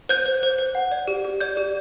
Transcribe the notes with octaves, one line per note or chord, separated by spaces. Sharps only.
C5 G6
C5
C5
C5
F#5
D5
G4
G4
D5 G6
G4